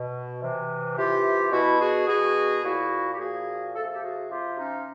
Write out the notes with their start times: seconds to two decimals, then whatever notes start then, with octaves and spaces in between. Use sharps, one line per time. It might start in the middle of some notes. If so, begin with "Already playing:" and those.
Already playing: B2
0.42 C3 E3
0.97 C3 E3 F4 G4
1.52 B2 E4 F#4
1.80 F#4 G#4
2.07 B2 F#4 G#4
2.63 A#2 F3 E4 F#4
3.13 G4
3.19 A#2 F3 F#4 G#4
3.75 C3 F3 A4
3.92 G4 A4
4.02 F#4 G#4
4.29 C3 F3 F4 G4
4.57 C#4 D#4